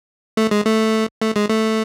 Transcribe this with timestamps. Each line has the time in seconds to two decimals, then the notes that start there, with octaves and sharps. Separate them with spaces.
0.37 A3
0.51 G#3
0.66 A3
1.22 A3
1.36 G#3
1.50 A3